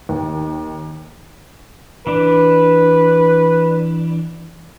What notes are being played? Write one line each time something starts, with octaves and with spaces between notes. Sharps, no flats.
D#2
E3 D4 B4